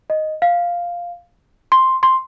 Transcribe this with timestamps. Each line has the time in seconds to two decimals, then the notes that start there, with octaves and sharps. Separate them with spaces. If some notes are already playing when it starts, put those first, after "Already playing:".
0.10 D#5
0.42 F5
1.72 C6
2.03 C6